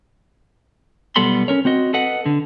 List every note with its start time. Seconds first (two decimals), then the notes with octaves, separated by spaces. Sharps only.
1.16 B1 G3 B3 A4 B5 C6
1.48 C#4 A#4 C#5
1.65 C4 F#4 D#5
1.93 A4 B4 D#5 F#5
2.26 D3